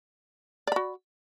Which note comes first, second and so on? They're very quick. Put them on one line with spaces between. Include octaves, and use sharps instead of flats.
D5 B5 F#4